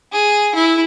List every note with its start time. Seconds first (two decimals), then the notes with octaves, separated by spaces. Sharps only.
0.12 G#4
0.55 E4